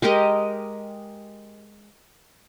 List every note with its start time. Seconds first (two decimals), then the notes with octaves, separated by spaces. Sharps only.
0.02 G#3 G4 A#4 D#5